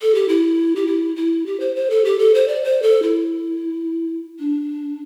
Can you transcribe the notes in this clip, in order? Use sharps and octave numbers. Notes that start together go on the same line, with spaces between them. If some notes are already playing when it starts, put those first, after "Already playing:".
A4
G4
E4
G4
E4
E4
G4
C5
C5
A4
G4
A4
C5
D5
C5
A4
E4
D4